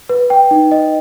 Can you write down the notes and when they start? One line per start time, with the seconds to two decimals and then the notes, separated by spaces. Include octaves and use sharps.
0.09 B4
0.30 G5
0.51 D#4
0.71 D#5